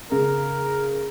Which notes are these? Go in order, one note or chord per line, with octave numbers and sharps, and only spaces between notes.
C#3 A#4